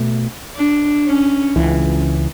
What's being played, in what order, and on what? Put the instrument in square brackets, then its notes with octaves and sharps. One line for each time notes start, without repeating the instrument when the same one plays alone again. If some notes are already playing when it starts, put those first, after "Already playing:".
Already playing: [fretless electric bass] B2 A3
[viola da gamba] D4
C#4
[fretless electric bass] C#2 C#3 E3